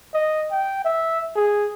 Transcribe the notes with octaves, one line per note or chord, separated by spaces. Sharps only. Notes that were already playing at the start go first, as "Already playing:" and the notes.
D#5
G5
E5
G#4